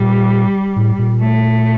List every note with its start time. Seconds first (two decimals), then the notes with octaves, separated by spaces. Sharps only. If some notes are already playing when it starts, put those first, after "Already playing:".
Already playing: A#2 G3
0.76 A2
0.98 A#2
1.21 A3